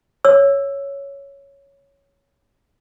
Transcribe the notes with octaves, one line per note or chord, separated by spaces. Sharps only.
C#5 E6